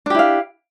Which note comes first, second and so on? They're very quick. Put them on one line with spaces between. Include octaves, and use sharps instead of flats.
D4 G4 E4 F5